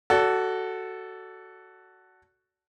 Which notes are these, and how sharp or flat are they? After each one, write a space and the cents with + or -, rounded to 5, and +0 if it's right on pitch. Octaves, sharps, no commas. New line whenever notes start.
F#4 +10 A4 +5 D5 -35